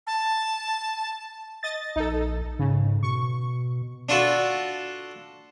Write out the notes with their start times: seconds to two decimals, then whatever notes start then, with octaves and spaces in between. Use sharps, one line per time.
0.07 A5
1.63 D#5 A6
1.96 A#1 D#4 A4
2.59 G#2 C#3
3.03 B2 C#6
4.09 D4 F4 F#4 A4